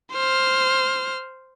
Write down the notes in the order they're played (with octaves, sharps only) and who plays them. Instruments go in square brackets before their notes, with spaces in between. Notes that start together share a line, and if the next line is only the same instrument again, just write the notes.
[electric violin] C5 F6